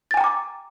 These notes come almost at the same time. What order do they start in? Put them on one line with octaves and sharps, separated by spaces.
A6 G#5 G5 A#5 D6